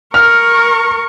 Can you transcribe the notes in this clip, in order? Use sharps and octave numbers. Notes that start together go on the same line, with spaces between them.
A#4 C#6 F6